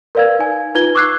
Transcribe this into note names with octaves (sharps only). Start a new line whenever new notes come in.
A#4 B4 D5 F5 E6 G#6
D#4 G#5
D#4 F4 B4 G#6 G7
C#6 D6 E6 F#6 G#6 C7